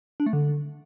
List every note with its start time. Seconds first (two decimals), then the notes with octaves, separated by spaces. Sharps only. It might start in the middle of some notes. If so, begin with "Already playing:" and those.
0.20 D4
0.26 A3
0.33 D3